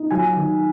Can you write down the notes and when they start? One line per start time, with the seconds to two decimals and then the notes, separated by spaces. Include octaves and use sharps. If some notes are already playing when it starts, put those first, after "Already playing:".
Already playing: D#4
0.11 F#3 G#5
0.36 D#3